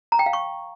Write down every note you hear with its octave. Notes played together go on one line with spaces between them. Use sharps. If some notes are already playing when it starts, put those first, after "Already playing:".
A#5
G5
F5
C#6